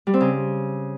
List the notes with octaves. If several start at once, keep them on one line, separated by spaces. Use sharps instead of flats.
G3
C4
C#3